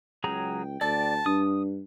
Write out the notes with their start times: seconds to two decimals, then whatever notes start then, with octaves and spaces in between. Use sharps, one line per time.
0.24 C#2 F#3 G#4 G5 A#5
0.81 D2 D5 A5
1.26 G2 D4 D#6